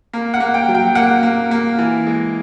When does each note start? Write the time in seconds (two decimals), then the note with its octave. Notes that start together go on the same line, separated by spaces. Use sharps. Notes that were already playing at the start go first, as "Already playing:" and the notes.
0.13 A#3
0.34 F#5
0.40 A#3
0.54 G5
0.68 F#3
0.75 G5
0.95 A#3 F#5
1.23 A#3
1.51 A#3
1.78 E3
2.06 G#3